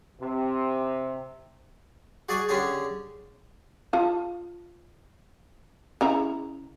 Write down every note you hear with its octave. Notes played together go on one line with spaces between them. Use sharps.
C3
F#4 G#4 D5 D#5 F#5 C#6
D3 C#4 D4 G4 G#4 C#5
F4 A5
C#3 E4 A#5